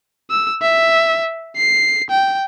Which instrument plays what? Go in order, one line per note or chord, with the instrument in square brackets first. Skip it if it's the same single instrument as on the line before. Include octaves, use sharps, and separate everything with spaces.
[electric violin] E6
E5
C7
G5